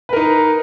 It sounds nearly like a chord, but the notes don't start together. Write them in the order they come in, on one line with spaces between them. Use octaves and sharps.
B4 A#4 D#4